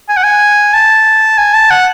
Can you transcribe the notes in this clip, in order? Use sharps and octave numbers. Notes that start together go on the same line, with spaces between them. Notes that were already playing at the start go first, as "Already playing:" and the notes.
G#5
F#5
G#5
A5
G#5
A5
F#5